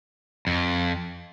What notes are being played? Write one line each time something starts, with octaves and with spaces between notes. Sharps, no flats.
F2